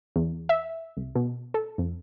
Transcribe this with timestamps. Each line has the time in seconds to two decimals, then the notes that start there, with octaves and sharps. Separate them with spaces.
0.16 E2
0.49 E5
0.97 C2
1.15 B2
1.54 A4
1.78 F2